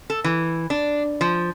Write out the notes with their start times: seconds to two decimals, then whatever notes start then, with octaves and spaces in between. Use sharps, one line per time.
0.10 A4
0.24 E3
0.70 D4
1.21 F3